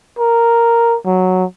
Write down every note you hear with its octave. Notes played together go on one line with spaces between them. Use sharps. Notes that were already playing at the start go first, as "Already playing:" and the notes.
A#4
F#3